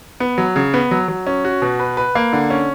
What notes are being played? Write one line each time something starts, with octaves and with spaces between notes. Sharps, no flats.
B3
F#3
C#3
B3
F#3
F#3
C#4
F#4
B2
B4
B4
A#3
D3
C#4